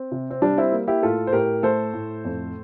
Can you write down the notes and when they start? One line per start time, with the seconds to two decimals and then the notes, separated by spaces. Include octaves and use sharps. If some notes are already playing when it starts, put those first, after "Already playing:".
Already playing: C4
0.12 C3
0.30 C4
0.42 G3 D4
0.58 C4 E4
0.72 A#3
0.88 E4 G4
1.03 A2 F4 A4
1.27 C5
1.33 A2 G4 A#4
1.63 A3 A4 C5
1.94 A2
2.25 F2